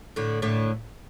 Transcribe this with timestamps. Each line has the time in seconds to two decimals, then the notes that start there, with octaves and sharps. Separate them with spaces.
0.16 A2 D3
0.42 A2 D3